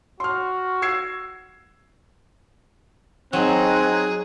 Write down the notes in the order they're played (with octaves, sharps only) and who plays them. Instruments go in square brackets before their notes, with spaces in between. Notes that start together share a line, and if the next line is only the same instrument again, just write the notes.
[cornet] F#4 [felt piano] C6 F6
[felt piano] E6 G#6 C7
[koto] F#3 [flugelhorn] C4 [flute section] D#4 F#6 G#6 [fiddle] G#4